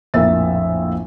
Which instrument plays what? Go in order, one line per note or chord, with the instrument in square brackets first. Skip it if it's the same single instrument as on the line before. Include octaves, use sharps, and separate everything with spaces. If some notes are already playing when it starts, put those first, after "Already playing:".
[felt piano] A#1 F2 A2 A#4 E5 A6